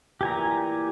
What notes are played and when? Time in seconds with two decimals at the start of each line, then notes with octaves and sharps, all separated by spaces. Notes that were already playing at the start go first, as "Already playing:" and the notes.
0.21 A#2 E3 G4 G#5 A#5